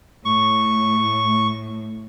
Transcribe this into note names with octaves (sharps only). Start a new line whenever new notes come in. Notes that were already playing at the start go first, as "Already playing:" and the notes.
A2 C#6